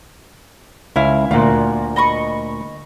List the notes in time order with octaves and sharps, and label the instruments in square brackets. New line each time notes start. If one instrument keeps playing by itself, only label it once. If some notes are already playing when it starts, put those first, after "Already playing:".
[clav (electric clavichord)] C#2 E4 F5 [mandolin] G#5
[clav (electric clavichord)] D2 A#2 [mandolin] F4 F#4
[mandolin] D#5 B5 C#6